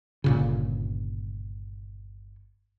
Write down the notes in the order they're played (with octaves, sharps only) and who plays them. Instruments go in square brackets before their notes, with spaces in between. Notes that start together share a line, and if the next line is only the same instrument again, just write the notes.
[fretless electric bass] G1 A#2 C#3